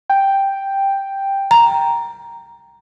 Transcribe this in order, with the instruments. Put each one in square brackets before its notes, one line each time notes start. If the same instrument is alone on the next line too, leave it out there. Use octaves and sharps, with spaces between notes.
[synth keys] G5
[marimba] A#5